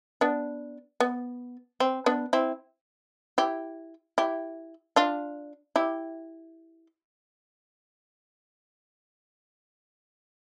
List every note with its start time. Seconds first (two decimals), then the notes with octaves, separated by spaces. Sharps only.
0.21 B3 D4
1.00 B3
1.80 C4
2.06 B3 D4
2.33 C4 E4
3.38 E4 G4
4.18 E4 G4
4.96 D4 F4
5.76 E4 G4